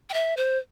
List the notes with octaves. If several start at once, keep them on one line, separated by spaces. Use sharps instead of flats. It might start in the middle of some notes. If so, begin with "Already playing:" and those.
G5
E5
C5